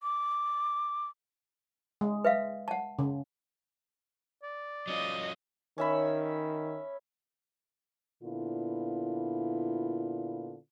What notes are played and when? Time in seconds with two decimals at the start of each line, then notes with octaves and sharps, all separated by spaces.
0.03 D6
2.01 G#3
2.25 B4 E5 F5
2.68 F#5 A5
2.99 C#3
4.43 D5
4.88 F#3 C#4 F4 D#5
5.78 D#3 C#4 E5 B5
8.22 A#2 D3 B3 E4 F4